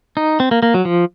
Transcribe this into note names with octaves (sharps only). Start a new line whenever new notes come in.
D#4
C4
A#3
A#3
F#3
F3